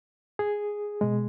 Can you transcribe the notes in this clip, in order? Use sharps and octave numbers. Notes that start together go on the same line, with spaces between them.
G#4
B2 G#3